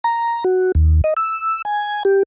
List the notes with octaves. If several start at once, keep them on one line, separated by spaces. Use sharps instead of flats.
A#5
F#4
D#2
D#5
E6
G#5
G4